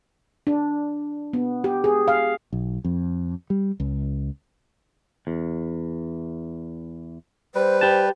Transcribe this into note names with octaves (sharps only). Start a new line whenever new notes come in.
D4
B3
G4
G#4
F5
B1
F2
G3
C#2
E2
G3 B4 C5
G4 A5